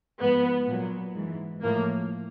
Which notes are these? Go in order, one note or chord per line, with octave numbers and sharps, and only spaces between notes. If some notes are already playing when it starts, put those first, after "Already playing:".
G#2 F3 B3
A#2
F#3
G#2 E3
A2 F3 A#3